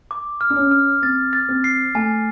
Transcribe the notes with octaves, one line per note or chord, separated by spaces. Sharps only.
D6
F6
D4
C#4
F6
C4 A6
A6
C4
C7
A3 G#5